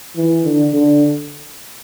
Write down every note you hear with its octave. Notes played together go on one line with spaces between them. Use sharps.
E3
D3
D3